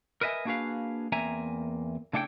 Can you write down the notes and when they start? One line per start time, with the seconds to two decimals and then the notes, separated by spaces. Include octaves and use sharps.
0.21 A#4 B4 D#5 E5 G#5
0.45 A#3 D4 F#4 G#4 B4 F5
1.12 E2 A#3 C4 E5 G#5 A#5
2.13 C#3 A3 D4 E4 F#5 G5